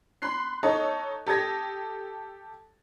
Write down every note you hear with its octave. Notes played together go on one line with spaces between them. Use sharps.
B5 C6 F#6 C7
D#4 A4 C#5 D#5
G4 A4 D#6 G#6 A#6